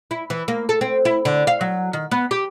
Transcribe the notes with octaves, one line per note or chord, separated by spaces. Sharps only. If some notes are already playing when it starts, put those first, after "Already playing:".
E4
E3
A#3
A4
C4
E4
D3
F5
F#3
D#3
B3
G4